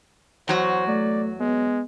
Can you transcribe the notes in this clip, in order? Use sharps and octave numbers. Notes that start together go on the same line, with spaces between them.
E2 F#3 F#4 C5
A3 D5
G#3 B3